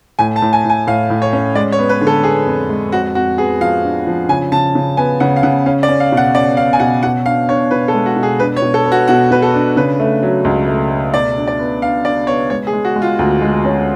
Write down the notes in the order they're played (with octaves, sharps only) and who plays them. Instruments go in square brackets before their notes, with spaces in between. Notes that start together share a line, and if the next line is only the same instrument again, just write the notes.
[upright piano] A2 [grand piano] G#5
[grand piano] A5
[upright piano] A2
[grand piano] G#5
[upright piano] A2
[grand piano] G#5
[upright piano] A2 [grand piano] F5
[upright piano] A2
[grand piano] C#5
[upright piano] C#4
[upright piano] G#3 [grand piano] D5
[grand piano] C#5
[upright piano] B3
[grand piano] B4
[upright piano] D3
[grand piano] A4
[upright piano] B3 [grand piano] G#4
[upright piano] F2
G#3
[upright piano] F2 [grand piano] F#4
[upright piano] F2 [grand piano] F#4
[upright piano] B3 [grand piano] G#4
[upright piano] F3 [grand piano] F5
[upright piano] D4
F3
[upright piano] C#3 [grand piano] G#5
[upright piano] C#3 [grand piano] A5
[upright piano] C#3
[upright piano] B3 [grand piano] G#5
[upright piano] C#3 [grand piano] F#5
[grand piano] F5
[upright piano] C#3 [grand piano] F#5
[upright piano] C#4 [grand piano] F5
[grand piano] D5
[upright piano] C#4
[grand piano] F5
[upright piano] B2
[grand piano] F#5
[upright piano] C#4 [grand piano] D5
[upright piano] C#4 [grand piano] F5
[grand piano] G#5
[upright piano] B2 [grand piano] F#5
[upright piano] B2 [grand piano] F#5
[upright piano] D4 [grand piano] F5
[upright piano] D4 [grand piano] C#5
[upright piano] B2 [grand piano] B4
[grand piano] A4
[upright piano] G#3
[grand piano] F#4
[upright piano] B2
[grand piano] G#4
[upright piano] D4 [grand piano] B4
[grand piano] C#5
[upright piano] B2
[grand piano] A4
[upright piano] B3
[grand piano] F#4
[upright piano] B2 [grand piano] F#4
[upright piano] B2 [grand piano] B4
[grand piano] A4
[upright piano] D4
[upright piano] C#3 [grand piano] B4
[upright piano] A3
F#3
C#2
A3
A3
[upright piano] B2 [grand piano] D5
[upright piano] D4
[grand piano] D5
[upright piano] B3
[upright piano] D4 [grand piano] F5
[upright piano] D4 [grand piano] D5
[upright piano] B3 [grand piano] C#5
[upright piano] G#3 [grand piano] C#5
[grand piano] G#4
[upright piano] G#3
[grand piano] F#4
[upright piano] G#3
[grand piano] F4
[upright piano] D2
G#3
C#4